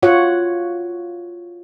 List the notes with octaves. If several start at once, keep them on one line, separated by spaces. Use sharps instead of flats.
F4 F#4 C#5 F#5